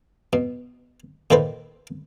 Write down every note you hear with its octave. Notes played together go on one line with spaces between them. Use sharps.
B2
A#2 D#3 A4 B4 C5